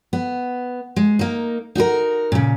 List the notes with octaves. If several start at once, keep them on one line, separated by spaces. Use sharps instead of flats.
B3
G#3
A#3 D#4
D#4 F#4 G#4 A#4
A#2 C#3